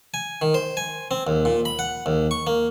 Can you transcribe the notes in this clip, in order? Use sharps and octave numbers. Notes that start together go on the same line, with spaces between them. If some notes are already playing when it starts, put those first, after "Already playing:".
G#5
D#3
C5
G#5
C4
D#2
A#2
B5
F#5
D#2
C#6
A#3